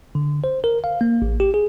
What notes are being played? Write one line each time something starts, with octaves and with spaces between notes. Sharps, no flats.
D3
C5
A#4
F5
A#3
A1
G4
G#4